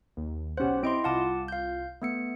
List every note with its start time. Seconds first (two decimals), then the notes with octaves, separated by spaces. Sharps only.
0.17 D#2
0.57 B1 C#4 G4 C5 F#5
0.83 C4 E4 D#5 C6 D7
1.04 C2 F4 F#5 A5 D6
1.48 F5 G6
2.02 A3 B3 C#7